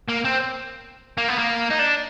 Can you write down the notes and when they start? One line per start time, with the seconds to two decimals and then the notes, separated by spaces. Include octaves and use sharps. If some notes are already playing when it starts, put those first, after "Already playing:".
0.08 A#3
0.24 C4
1.18 A#3
1.29 B3
1.39 A#3
1.71 D#4
1.79 D4